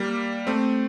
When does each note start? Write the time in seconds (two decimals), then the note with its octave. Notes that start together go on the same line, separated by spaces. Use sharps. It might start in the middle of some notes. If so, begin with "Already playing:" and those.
Already playing: G3 A#3
0.47 A3 C4